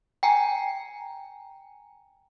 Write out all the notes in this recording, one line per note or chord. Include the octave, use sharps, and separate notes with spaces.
G5 G#5 A#5